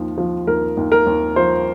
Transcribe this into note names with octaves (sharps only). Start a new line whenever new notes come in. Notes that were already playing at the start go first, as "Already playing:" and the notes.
Already playing: D#2 F3
F3
D#2 A#4
D#2
A#4
D#2
F3 C5